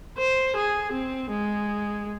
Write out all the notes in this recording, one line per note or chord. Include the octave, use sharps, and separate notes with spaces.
C5
G#4
C4
G#3